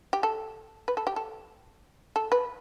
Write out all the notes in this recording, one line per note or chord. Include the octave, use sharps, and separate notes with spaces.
G4
A4
B4
A4
G4
A4
A4
B4